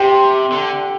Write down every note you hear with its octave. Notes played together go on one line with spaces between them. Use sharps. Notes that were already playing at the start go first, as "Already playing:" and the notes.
Already playing: C3 G4
D3